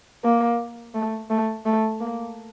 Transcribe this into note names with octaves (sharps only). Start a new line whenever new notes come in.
A#3
A3
A3
A3
A#3